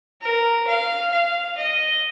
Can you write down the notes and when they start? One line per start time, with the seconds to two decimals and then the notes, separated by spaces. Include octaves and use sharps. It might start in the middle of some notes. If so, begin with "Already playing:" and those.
0.21 A#4
0.67 F5
1.12 F5
1.57 D#5